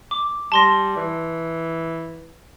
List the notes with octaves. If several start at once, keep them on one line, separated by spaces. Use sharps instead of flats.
D6
G3 A5 C6 A#6
E3